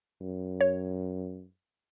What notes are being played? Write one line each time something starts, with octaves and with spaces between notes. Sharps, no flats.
F#2
C#5